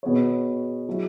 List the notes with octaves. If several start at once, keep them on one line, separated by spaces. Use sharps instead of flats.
B2 B3 G#4 C#5
F#3 E4 G#4